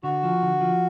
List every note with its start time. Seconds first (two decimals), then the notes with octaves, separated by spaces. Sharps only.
0.03 D3 F#4
0.23 F3
0.42 D3
0.61 F3